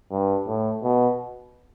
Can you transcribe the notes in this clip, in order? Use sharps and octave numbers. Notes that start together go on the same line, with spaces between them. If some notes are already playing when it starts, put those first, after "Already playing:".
G2
A2
B2